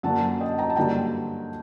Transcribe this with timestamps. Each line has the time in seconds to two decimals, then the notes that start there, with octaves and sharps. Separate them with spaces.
0.03 F#2 D3 F#3 A#3 F#5 A5
0.40 D#5 G5
0.58 G5 A#5
0.70 A5
0.76 G2 D3 F#3 A#3 G5 A#5